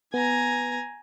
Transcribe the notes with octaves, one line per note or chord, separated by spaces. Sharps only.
B3 G#5 A#5